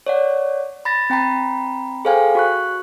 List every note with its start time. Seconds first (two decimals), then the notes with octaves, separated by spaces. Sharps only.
0.06 C#5 D5 F#5
0.85 B5 A6 A#6
1.10 C4 G5 A#5 B5
2.05 G#4 A4 C5 F5 G5 G#5
2.35 F#4 C#6 F#6